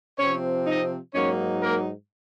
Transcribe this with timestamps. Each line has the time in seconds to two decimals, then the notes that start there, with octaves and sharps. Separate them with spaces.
0.19 C3 F3 C4 C#4 C#5
0.67 D#4 D#5
1.14 G#2 F#3 A#3 C#4 D#4 C#5
1.62 A#3 A#4